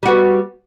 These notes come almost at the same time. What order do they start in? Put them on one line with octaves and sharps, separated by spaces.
G3 F#4 B3